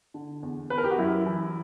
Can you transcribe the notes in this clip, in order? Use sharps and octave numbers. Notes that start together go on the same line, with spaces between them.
D3
E2
E2 B4
A#4
G4
F#4
F#2 E4
E3